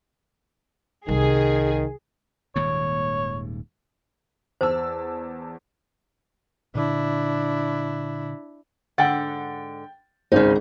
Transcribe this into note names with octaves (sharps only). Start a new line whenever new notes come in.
C2 D#3 G3 G#4
D#1 D#2 G#2 C#5
E2 C5 A5 E6
A#2 D3 D4 E4
G#2 D3 F#5 G5 A6
G#1 C#2 G#2 C#3 D#4 C5